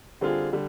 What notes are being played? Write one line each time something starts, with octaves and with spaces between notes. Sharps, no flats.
D3 G3 C4 F4 G#4
D3 G3